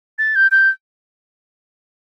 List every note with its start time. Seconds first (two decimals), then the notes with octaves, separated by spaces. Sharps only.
0.19 A6
0.36 G6
0.51 G6